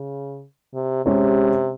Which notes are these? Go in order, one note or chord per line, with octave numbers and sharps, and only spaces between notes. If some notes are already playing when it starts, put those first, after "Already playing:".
Already playing: C#3
C3
C3 G#3 C#4 G4 C#5